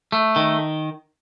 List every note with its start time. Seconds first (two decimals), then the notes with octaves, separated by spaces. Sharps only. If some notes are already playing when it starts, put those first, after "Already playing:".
0.12 A3
0.36 D#3